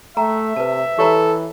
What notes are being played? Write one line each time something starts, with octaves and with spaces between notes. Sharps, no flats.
A3 E5 G5 A#5
C3 B4 A5
E3 G4 A4 C#5 A#5